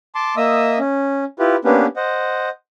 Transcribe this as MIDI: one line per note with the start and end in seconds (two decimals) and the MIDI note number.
0.15 0.35 81
0.15 0.35 84
0.15 0.35 86
0.37 0.78 58
0.37 0.78 75
0.37 0.78 76
0.37 0.78 87
0.37 0.78 88
0.79 1.24 61
1.39 1.56 64
1.39 1.56 65
1.39 1.56 67
1.39 1.56 71
1.65 1.86 58
1.65 1.86 59
1.65 1.86 61
1.65 1.86 62
1.65 1.86 67
1.65 1.86 71
1.96 2.49 72
1.96 2.49 75
1.96 2.49 78